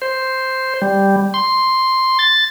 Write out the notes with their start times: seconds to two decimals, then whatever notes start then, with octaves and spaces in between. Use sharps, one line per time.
0.02 C5
0.82 G3
1.34 C6
2.19 A6